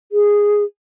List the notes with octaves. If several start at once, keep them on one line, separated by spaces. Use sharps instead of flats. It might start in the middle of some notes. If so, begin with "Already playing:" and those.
G#4